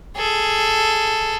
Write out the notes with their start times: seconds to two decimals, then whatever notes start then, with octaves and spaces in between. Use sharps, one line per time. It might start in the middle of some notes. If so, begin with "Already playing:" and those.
0.17 G#4 A4